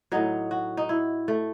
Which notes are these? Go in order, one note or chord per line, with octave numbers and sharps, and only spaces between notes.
A2 F#3 D#4
F#4
D#4
E4
A3